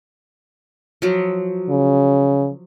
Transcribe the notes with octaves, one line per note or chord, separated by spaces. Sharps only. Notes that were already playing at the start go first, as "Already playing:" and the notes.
F3 F#3
C#3